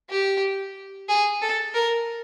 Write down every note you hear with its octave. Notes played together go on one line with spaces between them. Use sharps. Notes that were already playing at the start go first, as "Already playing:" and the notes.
G4
G#4
A4
A#4